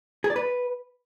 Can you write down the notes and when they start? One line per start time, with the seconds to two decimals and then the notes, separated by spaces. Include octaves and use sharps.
0.24 G#4
0.30 D5
0.36 B4